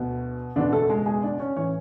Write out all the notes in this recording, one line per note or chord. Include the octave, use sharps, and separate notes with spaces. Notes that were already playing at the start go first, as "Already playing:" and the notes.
Already playing: D2 B2 D3 B3
F#1 E2 B2 D3 D4
A3 A4
G#3 G#4
G#3 G#4
D4 D5
C#4 C#5
A2 E3 C#4 C#5